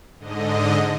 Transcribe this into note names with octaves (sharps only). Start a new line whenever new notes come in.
G#2 D3 D#5